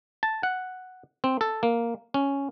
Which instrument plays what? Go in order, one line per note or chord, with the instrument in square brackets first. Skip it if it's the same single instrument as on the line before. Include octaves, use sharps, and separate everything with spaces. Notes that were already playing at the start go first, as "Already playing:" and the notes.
[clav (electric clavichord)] A5
F#5
C4
A4
A#3
C#4